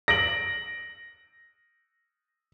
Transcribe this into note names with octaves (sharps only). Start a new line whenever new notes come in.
A#6 D7 F#7